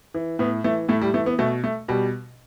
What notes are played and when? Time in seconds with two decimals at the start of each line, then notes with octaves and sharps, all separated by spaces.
0.14 E3
0.39 A2 B3
0.64 E3 A3
0.89 A2 A3
1.02 G3
1.14 E3 A3
1.26 B3
1.39 B2 A3
1.64 A3
1.88 B2 G3